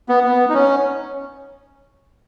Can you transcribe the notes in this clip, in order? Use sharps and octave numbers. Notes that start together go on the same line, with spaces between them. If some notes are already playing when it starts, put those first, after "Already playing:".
B3
B3
D#4
C#4